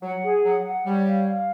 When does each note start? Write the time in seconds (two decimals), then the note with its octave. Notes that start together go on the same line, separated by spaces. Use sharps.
0.03 F#3 F#5
0.23 G#4
0.43 F#3 F#5
0.65 F#5
0.85 G3 C#5
1.05 F5
1.25 F5